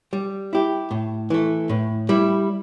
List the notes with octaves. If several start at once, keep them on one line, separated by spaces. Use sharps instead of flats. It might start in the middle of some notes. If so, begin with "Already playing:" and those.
G3
E4 G4
A2
E3 A3
A2
G3 E4